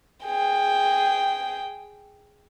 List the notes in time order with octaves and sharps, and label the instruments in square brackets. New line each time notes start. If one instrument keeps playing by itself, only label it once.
[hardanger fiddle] G#4 G5